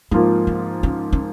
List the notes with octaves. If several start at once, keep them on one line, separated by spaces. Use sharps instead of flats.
G#2 F3 A#3 C4 F4
C4
C#4
C#4